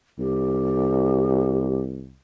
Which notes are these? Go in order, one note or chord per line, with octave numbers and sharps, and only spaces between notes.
C2 G4